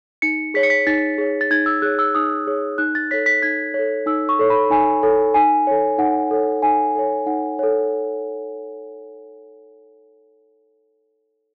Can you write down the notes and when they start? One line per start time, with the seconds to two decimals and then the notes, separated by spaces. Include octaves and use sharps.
0.22 D#4 C#7
0.54 G#4 C#5 B6
0.63 C#7
0.70 B6
0.87 D#4 A6
1.18 G#4 C#5
1.41 A6
1.51 D#4 G#6
1.66 E6
1.82 G#4 C#5 F#6
1.99 E6
2.15 D#4 D#6
2.47 G#4 C#5
2.78 D#4 F#6
2.95 A6
3.11 A4 C#5 B6
3.26 B6
3.42 D#4 G#6
3.74 A4 C#5
4.06 D#4 E6
4.29 C#6
4.39 A4 C#5
4.50 B5
4.70 D#4 G#5
5.03 A4 C#5
5.34 D#4 G#5
5.67 A4 C#5
5.98 D#4 F#5
6.31 A4 C#5
6.63 D#4 G#5
6.95 A4 C#5
7.26 D#4 F#5
7.59 A4 C#5